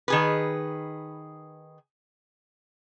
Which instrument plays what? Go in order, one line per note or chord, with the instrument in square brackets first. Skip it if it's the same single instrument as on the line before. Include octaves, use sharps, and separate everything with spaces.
[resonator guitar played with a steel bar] D#3 G#4 B4